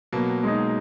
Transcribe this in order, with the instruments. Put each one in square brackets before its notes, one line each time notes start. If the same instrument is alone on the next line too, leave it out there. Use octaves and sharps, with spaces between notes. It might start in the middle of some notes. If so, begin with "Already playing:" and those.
[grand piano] B2 [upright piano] F#3 A#3
[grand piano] G#3 D#4